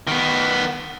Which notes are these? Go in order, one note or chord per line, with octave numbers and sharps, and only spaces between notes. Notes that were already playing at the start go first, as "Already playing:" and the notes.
D#3 B3